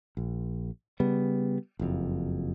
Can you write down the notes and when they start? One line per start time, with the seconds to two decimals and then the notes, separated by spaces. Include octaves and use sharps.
0.17 A#1
1.00 C#3 G3 B3
1.79 F#1 F2